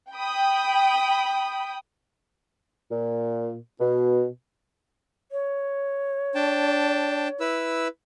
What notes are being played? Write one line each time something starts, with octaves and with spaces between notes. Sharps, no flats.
G5 B5 D#6
A#2
B2
C#5
D4 G5 A5
E4 B4 E6